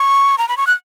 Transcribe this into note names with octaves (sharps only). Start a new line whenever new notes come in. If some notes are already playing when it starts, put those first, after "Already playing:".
Already playing: C#6
A#5
B5
C#6
F#6